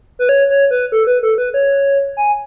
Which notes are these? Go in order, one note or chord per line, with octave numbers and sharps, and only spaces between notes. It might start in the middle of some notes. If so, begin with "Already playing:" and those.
B4
C#5
C#5
B4
A4
B4
A4
B4
C#5
G#5